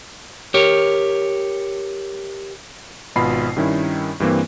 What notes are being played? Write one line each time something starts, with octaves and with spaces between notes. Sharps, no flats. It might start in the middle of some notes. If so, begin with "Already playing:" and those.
G4 A#4 C#5
G#1 B2 F4 B5 C7
G2 D#3 C#4 E4
G2 E3 A#3 C4